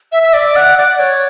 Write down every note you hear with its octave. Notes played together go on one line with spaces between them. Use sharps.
E5
E5
D5
F#5
D5
C#5